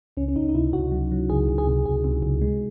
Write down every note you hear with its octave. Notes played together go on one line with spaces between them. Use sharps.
C#2 C#4
C#4
C#2 D#4
D#4
C3 E4
C#2 F#4
F#3
F#3
C#2 G#4
C#2
G#4
C3
C#2 G#4
C3
C#2
G#3